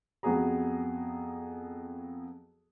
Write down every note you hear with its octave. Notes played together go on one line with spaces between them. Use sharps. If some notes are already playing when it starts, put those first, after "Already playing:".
F2 F#3 B3 F#4 G#4 A#5